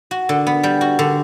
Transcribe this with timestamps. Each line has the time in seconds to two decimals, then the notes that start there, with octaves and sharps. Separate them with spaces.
0.11 F#4
0.29 D3
0.47 B3
0.63 G3
0.81 F#4
0.99 D3